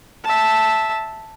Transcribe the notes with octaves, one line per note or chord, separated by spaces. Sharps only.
E5 A5